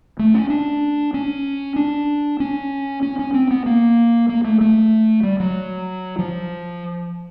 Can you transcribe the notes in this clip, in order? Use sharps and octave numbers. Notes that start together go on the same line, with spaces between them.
A3
C#4
D4
C#4
D4
C#4
C#4
C#4
C4
B3
A#3
A#3
A3
A3
G3
F#3
F3